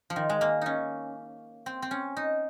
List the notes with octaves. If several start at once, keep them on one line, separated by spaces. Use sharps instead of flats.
F3
D#3
G#3
A#3
C#4 D#4
C4
C4
C#4
D#4